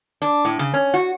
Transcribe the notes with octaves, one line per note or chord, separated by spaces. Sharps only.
D4
A2
C#3
C#4
F#4